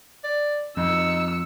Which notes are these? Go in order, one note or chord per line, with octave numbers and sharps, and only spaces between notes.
D5
F2 D#4 E6 C#7